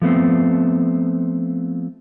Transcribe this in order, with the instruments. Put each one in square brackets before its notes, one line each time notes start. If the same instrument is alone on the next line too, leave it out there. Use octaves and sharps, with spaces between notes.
[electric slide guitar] F3 A3 B3 C4